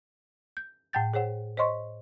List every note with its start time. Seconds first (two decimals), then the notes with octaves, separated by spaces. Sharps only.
0.57 G6
0.93 A2 F#5 G5 G6 A6
1.14 G#4 C5 C#5 F#5
1.57 C5 C#5 D#5 C6 C#6